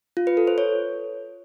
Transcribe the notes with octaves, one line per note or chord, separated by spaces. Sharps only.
F4
B4
A4
C5
C#5